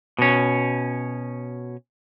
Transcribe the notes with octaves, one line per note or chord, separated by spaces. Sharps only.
B2 C#4